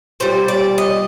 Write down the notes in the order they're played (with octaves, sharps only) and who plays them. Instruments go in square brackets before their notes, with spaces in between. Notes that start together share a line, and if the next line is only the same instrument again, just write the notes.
[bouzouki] A#2 G3 C5
D5
D#5